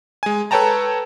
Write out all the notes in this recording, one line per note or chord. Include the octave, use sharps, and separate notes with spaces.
G#3 G#5
A4 B4 C#5 G5 A5 A#5